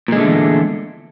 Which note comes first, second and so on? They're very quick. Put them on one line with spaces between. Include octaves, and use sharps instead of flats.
A#2 G#3 D3 A3 E2